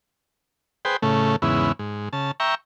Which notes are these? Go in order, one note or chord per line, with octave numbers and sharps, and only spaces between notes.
G#4 B4 C5 G5
A2 C#3 A3
E2 G#2 C#3 B3 E4
G#2
C#3 A5
E5 G5 A#5 C#6